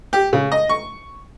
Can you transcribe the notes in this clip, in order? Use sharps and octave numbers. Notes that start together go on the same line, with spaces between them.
G4
C#3
D#5
C#6